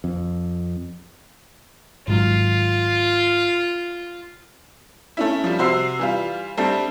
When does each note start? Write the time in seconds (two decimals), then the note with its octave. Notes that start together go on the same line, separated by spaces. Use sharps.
0.04 F2
2.08 G#1 G#2 F#3 F4
5.17 A3 C#4 E4
5.44 F3 G3
5.59 C3 F#4 C5 E6 C7
5.99 E3 G3 F4
6.57 G3 A3 C4 D4